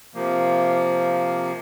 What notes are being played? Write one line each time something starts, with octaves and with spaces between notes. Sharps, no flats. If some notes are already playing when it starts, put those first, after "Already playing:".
C3 F3 A#3